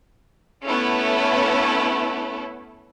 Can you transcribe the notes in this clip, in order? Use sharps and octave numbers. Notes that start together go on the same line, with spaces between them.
A3 B3 C#4 E4 A4